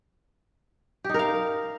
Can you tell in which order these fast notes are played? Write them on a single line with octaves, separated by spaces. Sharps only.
G4 D#4 A#4 F5